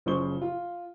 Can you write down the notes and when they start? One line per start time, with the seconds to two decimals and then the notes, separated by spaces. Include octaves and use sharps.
0.06 F#1 C#3 F3 C5 C#6 G7
0.42 F4